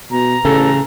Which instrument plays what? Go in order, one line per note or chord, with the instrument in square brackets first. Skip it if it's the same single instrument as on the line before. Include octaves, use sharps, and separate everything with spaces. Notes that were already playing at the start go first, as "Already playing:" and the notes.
[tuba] B2 [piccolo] A#5
[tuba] A1 [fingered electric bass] C#3 [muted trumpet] A4